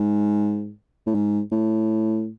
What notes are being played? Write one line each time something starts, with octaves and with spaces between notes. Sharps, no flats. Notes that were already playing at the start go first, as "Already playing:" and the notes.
Already playing: G#2
A2
G#2
A2